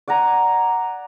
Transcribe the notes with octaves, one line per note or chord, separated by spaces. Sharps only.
D5 F#5 G#5 A#5